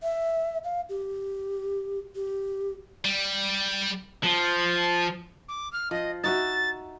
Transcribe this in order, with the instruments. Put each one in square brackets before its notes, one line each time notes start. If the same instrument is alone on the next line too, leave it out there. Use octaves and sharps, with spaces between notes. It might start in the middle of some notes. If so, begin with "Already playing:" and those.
[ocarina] E5
F5
G4
G4
[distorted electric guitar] G3
F3
[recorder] D6
F6
[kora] F3 [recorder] D#5
[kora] D#4 F#4 E5 [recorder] A6